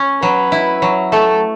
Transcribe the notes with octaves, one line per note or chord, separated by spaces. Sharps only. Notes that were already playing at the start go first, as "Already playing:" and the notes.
Already playing: C#4
F#3 B4
E4
F#3
A3 A4